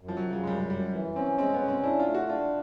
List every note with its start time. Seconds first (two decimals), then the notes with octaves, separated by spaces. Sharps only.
0.01 F#2
0.08 F3
0.17 F#3
0.25 C#3
0.33 F#3
0.43 G#3
0.47 F#2 G3
0.70 F#2 G3
0.93 E3
1.15 C4 C#4
1.38 G#3 C4
1.54 B3
1.61 C#4
1.68 C4
1.83 D4 E4
1.99 F4
2.06 A3
2.15 F#4
2.29 D4 F4